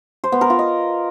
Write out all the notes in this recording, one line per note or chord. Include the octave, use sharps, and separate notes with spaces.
C5
B3
A#4
F4
D#5